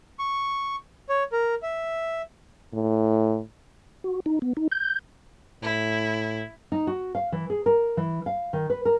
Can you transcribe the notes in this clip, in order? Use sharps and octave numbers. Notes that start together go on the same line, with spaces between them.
C#6
C#5
A#4
E5
A2
F#4
D#4
B3
D#4
G6
A2 E4
D#4
F#4
F5
E3
G#4
A#4
E3
F5
D#3
B4
A#4